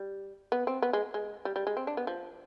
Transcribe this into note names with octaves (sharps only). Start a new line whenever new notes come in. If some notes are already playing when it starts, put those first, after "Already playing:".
Already playing: G3
B3
C4
B3
G#3
G#3
G3
G3
G#3
C4
D4
B3
F3